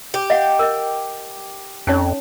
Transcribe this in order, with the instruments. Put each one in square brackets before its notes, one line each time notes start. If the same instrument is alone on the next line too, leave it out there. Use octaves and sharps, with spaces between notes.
[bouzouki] G4
[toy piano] D#5 F5 F#5
A#4 D#5
[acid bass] F2 [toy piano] C#4 D#4 C#5